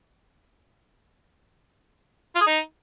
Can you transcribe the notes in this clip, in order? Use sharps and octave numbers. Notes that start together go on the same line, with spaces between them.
F4
G#4
D#4